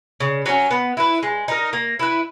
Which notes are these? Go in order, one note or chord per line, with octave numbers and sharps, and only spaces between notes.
C#3
F#3 C#4
B3
E4 B4
G#3
D#4 A#4
A#3
E4 B4